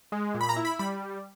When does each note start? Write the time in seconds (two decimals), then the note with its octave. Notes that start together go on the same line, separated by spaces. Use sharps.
0.12 G#3
0.34 A#2
0.41 B5
0.49 A#5
0.56 E4
0.65 B5
0.79 G3 B5